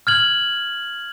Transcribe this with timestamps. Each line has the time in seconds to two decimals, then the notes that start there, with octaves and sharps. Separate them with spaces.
0.07 F6 G#6 F#7